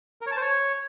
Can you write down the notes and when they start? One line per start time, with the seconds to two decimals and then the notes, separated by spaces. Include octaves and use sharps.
0.21 A#4
0.26 C#5
0.31 A5
0.36 C5
0.41 C#5